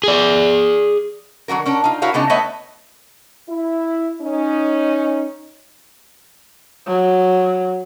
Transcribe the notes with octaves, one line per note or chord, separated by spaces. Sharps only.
G#4 D5
D3 F#3 F#4 A#4
C#4 D4 A#4
D#4 F4
E4 F#4 A#4 C#5 F5
C#3 G#3 B3 D4 D#4
A3 B3 B4 C#5 D#5 E5
E4
C#4 D#4
F#3